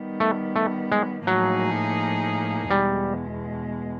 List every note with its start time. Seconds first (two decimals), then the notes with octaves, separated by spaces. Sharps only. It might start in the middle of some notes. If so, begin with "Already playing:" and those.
Already playing: D#3 G3 B3
0.20 A3
0.56 A3
0.92 G#3
1.27 A2 F3 F#3 A#3 D#4 G#4
2.71 E2 B2 G3 G#3